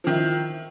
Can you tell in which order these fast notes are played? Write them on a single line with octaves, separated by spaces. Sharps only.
F3 D#3 E4